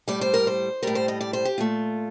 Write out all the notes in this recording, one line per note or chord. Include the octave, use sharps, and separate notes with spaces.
A2 G3 D5
C5
A#4
C5
A2 G3 A#4
C5
D#5
D5
C5
G4
A#2 A3 F4